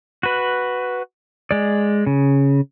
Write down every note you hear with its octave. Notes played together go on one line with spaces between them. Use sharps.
F#4 B4
G#3 D5
C#3